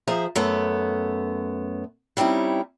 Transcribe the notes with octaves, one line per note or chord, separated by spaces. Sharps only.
F3 G#4 C5 E5 A#5
F#2 A3 B3 A5
G3 C4 C#4 D#4 E4